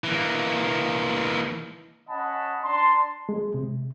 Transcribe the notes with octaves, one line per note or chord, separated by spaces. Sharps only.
E3 A#3
C#4 D#5 F#5 G#5 A5 B5
D4 A5 A#5 C6
G#3
C3